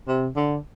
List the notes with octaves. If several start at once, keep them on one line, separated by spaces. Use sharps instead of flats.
C3
D3